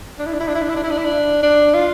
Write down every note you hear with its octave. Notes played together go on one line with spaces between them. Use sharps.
D4
E4
D4
E4
D4
E4
D4
E4
D4
E4
D4
E4
D4
D4
F4